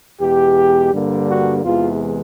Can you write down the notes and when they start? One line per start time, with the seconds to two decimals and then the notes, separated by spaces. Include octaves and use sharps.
0.21 E2 B2 G#3 G4
0.92 G2 D3 G3 A#3
1.28 F#4
1.64 E2 C3 E3 G#3 F4